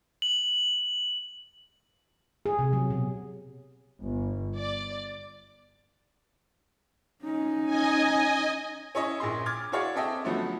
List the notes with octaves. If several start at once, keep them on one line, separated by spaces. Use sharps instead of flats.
F#7
G#4
C3
F#3
B2
G1
D5
C#4 D#4
D#5 G#5
C#4 E4 C#5 D#5 G#5
A#1 A#2 G#4 C6
D6 F6 G#6 A6
E4 F#4 G#4 C#5 D5 F5
C4 G#4 A4 D#5 E5 G5
D3 F3 F#3 A3 B3 C#4